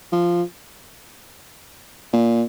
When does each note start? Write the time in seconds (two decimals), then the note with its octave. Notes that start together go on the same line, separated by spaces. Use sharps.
0.13 F3
2.13 A#2